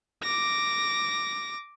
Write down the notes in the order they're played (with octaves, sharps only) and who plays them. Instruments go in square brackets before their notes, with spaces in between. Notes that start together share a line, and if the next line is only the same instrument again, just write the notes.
[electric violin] D6 A#6